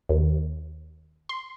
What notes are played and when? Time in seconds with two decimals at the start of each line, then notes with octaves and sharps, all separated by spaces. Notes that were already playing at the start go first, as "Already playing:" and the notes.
0.09 D#2
1.29 C6